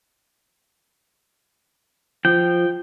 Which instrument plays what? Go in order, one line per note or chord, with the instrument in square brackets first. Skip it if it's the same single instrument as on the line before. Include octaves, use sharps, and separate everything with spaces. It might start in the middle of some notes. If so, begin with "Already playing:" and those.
[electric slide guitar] F3 [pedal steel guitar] G5